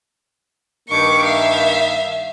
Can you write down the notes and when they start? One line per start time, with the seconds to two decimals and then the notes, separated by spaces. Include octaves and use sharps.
0.88 G2 D#3 A#3 C#6 D6
1.24 E5 F5